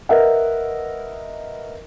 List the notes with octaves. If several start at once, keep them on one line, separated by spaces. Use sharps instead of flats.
A#4 B4 D#5 E5 F#5